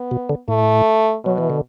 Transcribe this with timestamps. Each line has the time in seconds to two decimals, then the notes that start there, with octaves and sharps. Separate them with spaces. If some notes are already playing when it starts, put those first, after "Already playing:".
Already playing: B3
0.11 B2
0.29 D3
0.48 A2 A3
1.24 B2 F#3
1.38 E3
1.50 D3